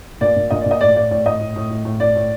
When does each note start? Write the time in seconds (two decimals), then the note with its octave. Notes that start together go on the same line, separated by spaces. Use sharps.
0.21 A#2 D5
0.36 A#2
0.50 A#2 D#5
0.61 D5
0.66 A#2
0.71 D#5
0.81 A2 D5
0.96 A2 D5
1.11 A2 D5
1.26 A2 D#5
1.41 A2
1.56 A2
1.70 A2
1.85 A2
2.00 A2 D5
2.15 A2